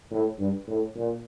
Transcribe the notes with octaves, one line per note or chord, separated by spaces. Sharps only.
A2
G2
A2
A#2